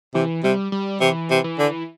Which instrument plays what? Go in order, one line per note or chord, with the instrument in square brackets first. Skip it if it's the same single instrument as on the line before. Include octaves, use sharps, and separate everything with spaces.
[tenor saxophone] C3 [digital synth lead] E3
[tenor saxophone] C3 [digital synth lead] G3
[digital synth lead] G3
[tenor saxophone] C3 [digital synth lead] E3
[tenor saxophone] C3
[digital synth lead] E3
[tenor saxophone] D3